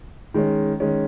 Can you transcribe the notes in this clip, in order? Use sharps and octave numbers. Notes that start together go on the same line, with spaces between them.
D#3 G#3 C#4
D#3 G#3 C#4